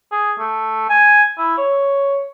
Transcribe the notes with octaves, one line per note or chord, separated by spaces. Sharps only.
G#4
A3
G#5
E4
C#5